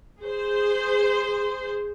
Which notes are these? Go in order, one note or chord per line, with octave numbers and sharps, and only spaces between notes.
G#4 C5